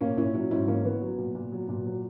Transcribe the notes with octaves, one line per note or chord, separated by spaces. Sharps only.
A#2 A#3 C#4
A#2 C#4 E4
F#3 C#4 E4
G#2 C#4 E4
E3 A#3 C#4
E3 B3
F#3
A#2
A#2
F#3
A#2
F#3